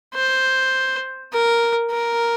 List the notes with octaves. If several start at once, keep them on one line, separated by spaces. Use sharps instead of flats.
C5
A#4
A#4